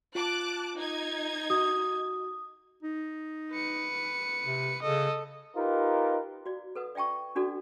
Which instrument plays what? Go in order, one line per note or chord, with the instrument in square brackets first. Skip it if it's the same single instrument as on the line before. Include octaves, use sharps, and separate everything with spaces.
[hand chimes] F4 [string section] A5 D6 F#6
[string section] D#4 G#6
[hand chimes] F#4 [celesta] D#6
[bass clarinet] D#4
[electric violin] B4 C#7
[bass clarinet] C3
[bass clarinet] C#3 [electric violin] A4 D#5
[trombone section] D#4 F4 G4 A#4 B4
[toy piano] F#4 D5
A4 B4 F#5 D#6
D5 E5 G5 A5 C#6
C#4 D4 F#4 A4 D5